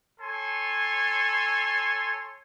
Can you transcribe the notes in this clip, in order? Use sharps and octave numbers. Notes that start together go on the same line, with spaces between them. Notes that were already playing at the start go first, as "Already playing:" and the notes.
A4 C#5 G#5 C6